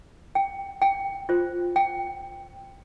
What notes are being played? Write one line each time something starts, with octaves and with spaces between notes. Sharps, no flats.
G5
G5
F4 C5
G5